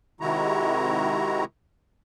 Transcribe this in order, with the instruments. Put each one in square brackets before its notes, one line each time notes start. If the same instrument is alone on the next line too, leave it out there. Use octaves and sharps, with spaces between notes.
[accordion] C3 D#3 G#3 E4 F#4 A#5